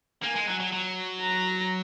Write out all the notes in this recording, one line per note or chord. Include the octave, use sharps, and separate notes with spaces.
A#3 G#5
G#3
F#3
F#3
F#3
A#5